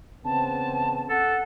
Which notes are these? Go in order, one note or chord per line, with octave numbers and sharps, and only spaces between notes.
C#3 E3 B3 C4 A5
A4 F#5